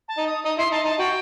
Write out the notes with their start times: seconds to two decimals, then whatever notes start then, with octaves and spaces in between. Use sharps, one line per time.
0.08 A5
0.18 D#4
0.26 D#6
0.44 D#4 D#6
0.58 E4 C6
0.71 D#4 A5
0.85 D#4 A5
0.99 F#4 G5